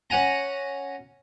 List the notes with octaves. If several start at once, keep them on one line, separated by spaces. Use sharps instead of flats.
C#4 F#5 G#5 A#5